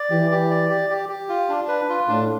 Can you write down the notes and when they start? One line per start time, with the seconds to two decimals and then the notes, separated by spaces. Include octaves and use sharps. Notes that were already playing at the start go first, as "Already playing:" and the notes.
Already playing: D5
0.10 E3 G4
0.31 G4
0.50 D5
0.70 G4
0.90 G4
1.09 G4
1.29 F4
1.49 D4
1.68 B4
1.89 F4
2.08 A2 D4